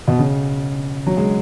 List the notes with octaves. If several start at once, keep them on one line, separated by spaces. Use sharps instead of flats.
B2
C#3
F#3
G#3